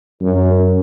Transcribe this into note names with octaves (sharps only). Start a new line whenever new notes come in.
F#2